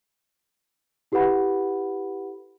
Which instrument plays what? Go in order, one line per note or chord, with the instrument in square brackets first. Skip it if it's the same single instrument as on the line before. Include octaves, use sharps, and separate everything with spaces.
[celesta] E4 G4 A4 B4 F#5 B5